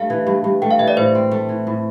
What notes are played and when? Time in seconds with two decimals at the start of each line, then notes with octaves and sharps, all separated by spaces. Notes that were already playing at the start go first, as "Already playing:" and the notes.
Already playing: G2 A3 F5
0.10 E3
0.26 G2
0.44 G2
0.62 A3 G5
0.71 F5
0.79 E3 E5
0.88 D5
0.97 A2 C5
1.15 C4
1.31 A3
1.49 E3
1.67 A2